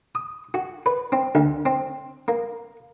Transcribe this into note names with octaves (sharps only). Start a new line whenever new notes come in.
D#6
F#4
B4
C4
D2
C4
A#3